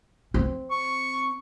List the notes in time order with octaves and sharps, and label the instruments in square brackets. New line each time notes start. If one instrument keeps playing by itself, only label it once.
[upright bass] C4
[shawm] C#6